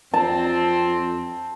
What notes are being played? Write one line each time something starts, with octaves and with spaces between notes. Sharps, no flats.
F2 C4 A5